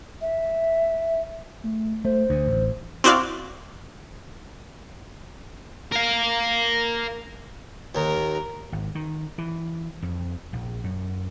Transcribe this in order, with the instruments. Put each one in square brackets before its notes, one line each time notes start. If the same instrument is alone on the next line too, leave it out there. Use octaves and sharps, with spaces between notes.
[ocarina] E5
[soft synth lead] A3
[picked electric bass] A3 [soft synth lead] C5
[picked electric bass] D2
A1
[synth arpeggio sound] C4 E4 F#4 D5 F5
[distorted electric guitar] A#4 F5
[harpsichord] D#2 [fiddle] A#4
[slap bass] G#1
D#3
E3
F2
A#1
F#2